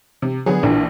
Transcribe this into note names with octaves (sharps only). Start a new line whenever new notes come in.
C3
D3 F#3 B3 G#4
A#1 E3 D4 F4 A#4